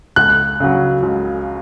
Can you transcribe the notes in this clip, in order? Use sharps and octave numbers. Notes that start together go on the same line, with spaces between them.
C#2 F#6
C#3 F#3
C#2